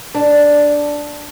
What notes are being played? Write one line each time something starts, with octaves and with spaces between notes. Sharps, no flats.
D4